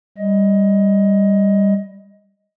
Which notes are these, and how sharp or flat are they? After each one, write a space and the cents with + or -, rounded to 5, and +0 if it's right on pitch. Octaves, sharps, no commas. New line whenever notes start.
G3 +10 D#5 +15